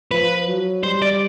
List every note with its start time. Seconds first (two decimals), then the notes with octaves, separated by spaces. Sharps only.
0.11 F3 B4
0.48 F#3
0.84 G3 C5
1.02 D5